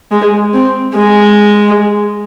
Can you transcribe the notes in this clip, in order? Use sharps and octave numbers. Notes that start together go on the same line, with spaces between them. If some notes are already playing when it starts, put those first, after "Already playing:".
G#3
C4
G#3